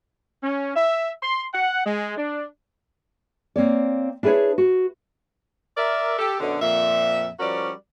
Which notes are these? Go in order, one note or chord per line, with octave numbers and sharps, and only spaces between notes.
C#4
E5
C6
F#5
G#3
D4
A#3 C4 C#5 D5
D4 E4 G#4 A4 B4 C#5
F#4
A#4 D5 E5
G4 A4
F#2 B2 D3
F2 A#2 E5
F3 G3 C#4 F#4 A#4 D5